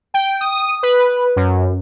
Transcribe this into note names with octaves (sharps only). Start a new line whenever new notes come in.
G5
D#6
B4
F#2